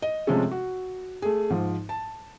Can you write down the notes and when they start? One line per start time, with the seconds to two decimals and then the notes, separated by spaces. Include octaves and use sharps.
0.02 D#5
0.27 C3 F3 G#3 A3 C#4 A4
0.51 F#4
1.22 A3 G#4
1.50 G#2 F3
1.89 A5